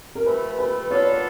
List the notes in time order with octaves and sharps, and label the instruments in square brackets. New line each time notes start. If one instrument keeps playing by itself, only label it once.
[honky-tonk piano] A#4
[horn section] C3 F3 A3 [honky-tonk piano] B4
[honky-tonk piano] B4
[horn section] F#3 B3 D4 F4 A4 [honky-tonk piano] C#5
[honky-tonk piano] D5